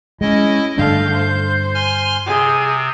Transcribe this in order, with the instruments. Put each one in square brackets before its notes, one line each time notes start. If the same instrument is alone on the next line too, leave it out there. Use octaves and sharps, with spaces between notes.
[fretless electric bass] G#3 [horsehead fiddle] C#4 [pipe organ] E4 D#5
[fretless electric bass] G2 D3 D4 [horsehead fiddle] A3 F5 [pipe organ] G6
[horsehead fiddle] C5
[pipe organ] G#5 C6 F6
[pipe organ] C3 [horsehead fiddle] G#4